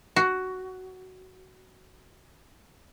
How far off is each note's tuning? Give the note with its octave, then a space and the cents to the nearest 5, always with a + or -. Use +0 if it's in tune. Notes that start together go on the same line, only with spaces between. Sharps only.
F#4 +10